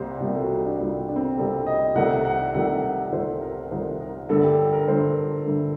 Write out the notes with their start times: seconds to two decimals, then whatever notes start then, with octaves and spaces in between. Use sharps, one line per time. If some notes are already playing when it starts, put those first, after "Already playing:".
Already playing: C2 C3 G3 A#3 C5
0.20 C2 C3 G3 A#3
0.36 A4
0.44 F#4
0.51 D#4
0.65 D4
0.79 C2 C3 G3 A#3 D4
1.08 D4
1.16 C4
1.23 D4
1.38 C2 C3 G3 A#3 A4
1.66 D#5
1.95 C2 C3 D#3 A3 F#5
2.25 F#5
2.54 C2 C3 D#3 A3 F#5
2.84 F#5
3.12 C2 C3 D#3 A3 C5
3.41 A#4
3.70 C2 C3 D#3 A3 C5
4.00 A#4
4.29 G2 D3 A3 A4
4.44 G4
4.59 A4
4.73 A#4
4.88 G2 D3 A3 C5
5.46 G2 D3 A3